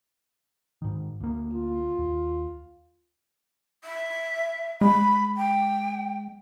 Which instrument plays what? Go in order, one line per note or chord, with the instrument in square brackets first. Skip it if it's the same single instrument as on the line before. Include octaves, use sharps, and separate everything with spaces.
[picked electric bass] G#2 D#3
D2 A#3
[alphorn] F4
[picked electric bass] D#2
[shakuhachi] E5
[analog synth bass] G#3 [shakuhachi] B5
[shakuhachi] G5